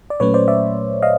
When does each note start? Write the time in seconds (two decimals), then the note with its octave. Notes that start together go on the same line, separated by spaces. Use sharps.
0.10 D5
0.20 A#2 F#3 A3 C#4 B4 C#5
0.34 C5 D5
0.48 D5 E5
1.03 D#5 F5